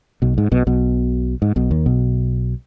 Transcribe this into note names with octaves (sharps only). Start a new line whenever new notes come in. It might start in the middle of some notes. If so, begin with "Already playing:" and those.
B1 B2
G#2
B1 B2
B1 B2
G#2
B1 B2
D#2 D#3
B1 B2